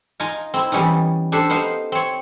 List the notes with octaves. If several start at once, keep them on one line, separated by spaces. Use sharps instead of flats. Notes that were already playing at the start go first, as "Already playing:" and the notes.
D#4 F4 D#5 G#5 A#5
C4 E4
E3 G3 B3 C#4 D#4
D4 G4 A4 C5
B3 D#4 C5 F5
C4 C#5